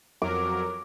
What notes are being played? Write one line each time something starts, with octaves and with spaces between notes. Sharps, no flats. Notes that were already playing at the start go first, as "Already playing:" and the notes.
F2 F#3 A#4 D6